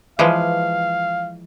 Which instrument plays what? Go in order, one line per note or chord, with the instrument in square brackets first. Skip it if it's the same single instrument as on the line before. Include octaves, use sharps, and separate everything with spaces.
[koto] E3 F3 G#3 [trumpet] F5